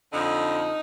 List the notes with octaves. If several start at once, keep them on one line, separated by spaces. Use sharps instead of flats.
F2 D3 D#4